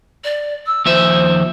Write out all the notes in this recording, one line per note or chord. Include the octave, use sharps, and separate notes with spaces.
D5
E6
D#2 F3 C5 E5